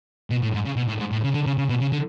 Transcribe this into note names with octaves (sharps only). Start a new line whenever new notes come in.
B2
A2
G#2
C#3
B2
A2
G#2
A2
C#3
D3
C#3
C#3
B2
C#3
D3